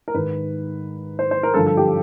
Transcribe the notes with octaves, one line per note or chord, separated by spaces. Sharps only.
A#4
G#2 D#3 B4
C5
C5
A#4
G2 D3 F3 A4
A4
G4